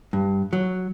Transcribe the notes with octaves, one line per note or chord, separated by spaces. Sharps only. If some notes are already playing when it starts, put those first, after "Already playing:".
G2
F#3